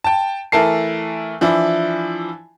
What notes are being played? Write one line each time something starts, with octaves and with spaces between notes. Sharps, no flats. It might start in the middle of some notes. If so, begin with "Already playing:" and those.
G5 A5
E3 A3 A#4 A5 C7
E3 F3 D4 E4